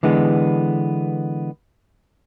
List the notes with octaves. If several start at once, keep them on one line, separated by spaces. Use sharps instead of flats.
D3 E3 G#3 B3